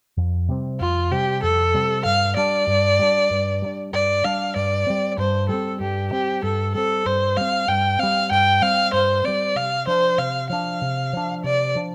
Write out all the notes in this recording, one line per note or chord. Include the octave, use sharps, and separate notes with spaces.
F2
C3 G3 C4
F2 F4
C3 G3 C4 G4
F2 A4
C3 G3 C4
G2 F5
G3 D4 D5
G2
G3 D4
G2
G3 D4
G2 D5
G3 D4 F5
G2 D5
G3 C4
G2 C5
G3 C4 A4
G2 G4
G3 C4 G4
G2 A4
G3 C4 A4
G2 C5
G3 C4 F5
G2 G5
G3 C4 F5
G2 G5
G3 C4 F5
G2 C5
G3 C4 D5
C3 F5
F3 D4 C5
C3 F5
F3 D4 F5
C3
F3 D4
C3 D5
F3 D4